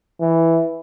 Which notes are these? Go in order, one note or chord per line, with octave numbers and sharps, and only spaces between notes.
E3